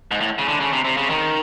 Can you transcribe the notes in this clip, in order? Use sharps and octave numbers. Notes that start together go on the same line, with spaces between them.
G#2
A2
C#3
D3
C#3
C3
C3
C#3
D#3